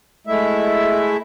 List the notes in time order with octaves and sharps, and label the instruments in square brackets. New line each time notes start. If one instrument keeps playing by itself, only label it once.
[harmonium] G#3 A3 E4 E5